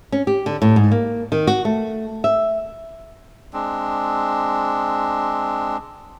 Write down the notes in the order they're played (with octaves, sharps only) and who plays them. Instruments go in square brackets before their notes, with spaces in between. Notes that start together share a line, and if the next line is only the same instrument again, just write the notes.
[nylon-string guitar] C#4
G4
D3
A2
G#2
A#3
D#3
F#4
A3
E5
[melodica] G#3 C4 D4